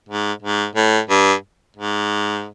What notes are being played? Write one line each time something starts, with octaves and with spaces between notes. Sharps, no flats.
G#2
G#2
A2
G2
G#2